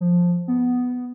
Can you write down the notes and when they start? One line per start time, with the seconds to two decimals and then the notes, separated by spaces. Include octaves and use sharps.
0.01 F3
0.48 B3